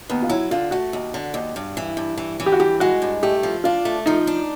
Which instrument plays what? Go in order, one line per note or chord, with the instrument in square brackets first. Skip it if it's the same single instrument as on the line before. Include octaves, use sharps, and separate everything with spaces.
[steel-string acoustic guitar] D#2 [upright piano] B3
[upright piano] F4
[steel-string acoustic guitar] F#3 [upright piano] E4
[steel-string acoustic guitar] D3 [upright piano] F4
[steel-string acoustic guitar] A3 [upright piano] F#4
[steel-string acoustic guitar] D#2
D3
D#2
G2
E3
G2
E3
E3
[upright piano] G4
F#4
[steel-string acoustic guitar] G2 [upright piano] G4
[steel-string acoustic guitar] G#3 [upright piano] F#4
[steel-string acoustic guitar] G2
[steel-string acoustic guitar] A3 [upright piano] G4
[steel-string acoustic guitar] F3
[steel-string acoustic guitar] D4 [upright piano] F4
[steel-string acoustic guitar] A3
[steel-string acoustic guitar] F3 [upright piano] D#4
[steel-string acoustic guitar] D4